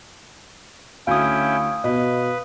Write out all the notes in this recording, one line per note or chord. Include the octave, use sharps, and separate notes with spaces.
D2 C#4 E4 F5 G5 D#6
B2 B4 D#5